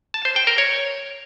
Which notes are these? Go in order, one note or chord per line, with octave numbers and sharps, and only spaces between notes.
A5
C5
G5
A#4
C#5